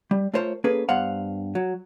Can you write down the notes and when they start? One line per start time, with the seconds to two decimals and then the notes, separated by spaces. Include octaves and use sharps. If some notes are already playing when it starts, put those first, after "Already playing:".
0.11 G3
0.34 A3 F4 A#4 C5 C#5
0.64 A#3 C#4 G#4 A4 B4
0.89 G2 B3 C5 F5 F#5
1.55 F#3